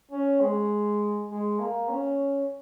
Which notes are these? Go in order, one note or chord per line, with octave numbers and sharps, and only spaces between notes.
C#4
G#3
G#3
A#3
C#4